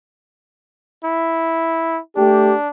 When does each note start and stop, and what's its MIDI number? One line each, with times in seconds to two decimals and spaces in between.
1.04 1.99 64
2.16 2.53 57
2.16 2.68 62
2.16 2.53 67